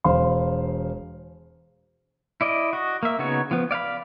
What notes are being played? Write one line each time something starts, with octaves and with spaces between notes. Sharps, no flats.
E1 C5 F5 C6
E4 D5 D#5
F#4 D#5
A#3 E5
C#3 B3 D#4 F#4 C#5
F3 B3
D5 F5 F#5 B5